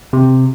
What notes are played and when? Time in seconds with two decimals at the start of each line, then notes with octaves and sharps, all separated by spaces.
0.13 C3